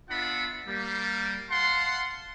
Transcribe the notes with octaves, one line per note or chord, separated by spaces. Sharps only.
B3 D4 F4 E5 F#5 B5
G3 A#3
F5 F#5 A5 C6